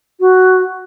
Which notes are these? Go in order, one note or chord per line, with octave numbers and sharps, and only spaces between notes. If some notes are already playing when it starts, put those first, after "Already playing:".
F#4